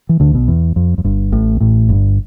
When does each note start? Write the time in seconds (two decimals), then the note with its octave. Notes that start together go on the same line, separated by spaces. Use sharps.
0.09 E3
0.20 D2 D3
0.34 B1 B2
0.48 E2
0.76 F2
0.98 F2
1.05 G1 G2
1.32 A1 A2
1.60 A1 A2
1.89 G1 G2